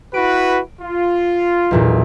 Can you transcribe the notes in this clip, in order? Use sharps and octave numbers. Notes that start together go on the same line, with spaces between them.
E4 F#4 B4 D7
F4
B1 E2 A#2